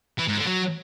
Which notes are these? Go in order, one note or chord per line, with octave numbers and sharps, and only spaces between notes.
E3
G#2
D3
F#3